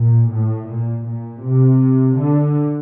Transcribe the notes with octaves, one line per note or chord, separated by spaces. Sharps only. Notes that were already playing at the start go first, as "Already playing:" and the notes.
Already playing: A#2
A2
A#2
A#2
C3
D3